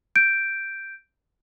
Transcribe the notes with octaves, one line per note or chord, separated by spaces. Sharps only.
G6 D7